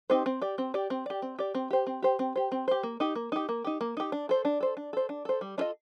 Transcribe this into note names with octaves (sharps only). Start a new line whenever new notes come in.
C4 D#4 G4 C5
C4
G4 D5
C4
G4 D5
C4
G4 D5
C4
G4 D5
C4
G4 C5
C4
G4 C5
C4
G4 C5
C4
G4 C5
A#3
D#4 G4
A#3
D#4 G4
A#3
D#4 G4
A#3
D#4 G4
D4
A4 C5
D4
A4 C5
D4
A4 C5
D4
A4 C5
G3
D4 F4 A4 D#5